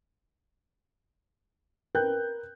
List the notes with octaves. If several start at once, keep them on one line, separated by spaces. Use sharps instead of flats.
A#4 B4 G5 F#6 G6